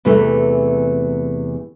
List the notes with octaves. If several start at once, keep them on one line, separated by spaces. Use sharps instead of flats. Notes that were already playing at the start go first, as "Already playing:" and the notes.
E2 C3 E3 A3